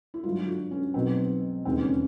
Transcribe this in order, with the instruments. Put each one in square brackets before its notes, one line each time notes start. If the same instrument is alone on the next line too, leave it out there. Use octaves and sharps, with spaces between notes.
[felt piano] E4
G#1 G2 D3 F#3 F4
F#4
C#4
B1 B2 F#3 C4
E1 D#2 C#3 E3 C4
C#4